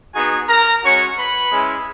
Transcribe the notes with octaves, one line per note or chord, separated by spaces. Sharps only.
B3 D#4 F#4 G#4 G#5
A#4 A#5
G#3 C#4 F#4 C#5 C#6
B4 B5
G#3 C#4 E4